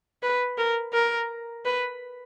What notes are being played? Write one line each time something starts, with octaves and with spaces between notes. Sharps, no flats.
B4
A#4
A#4
B4